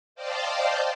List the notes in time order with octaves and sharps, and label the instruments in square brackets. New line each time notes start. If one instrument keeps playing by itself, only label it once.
[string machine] C5 D5 D#5 F5 G5 A5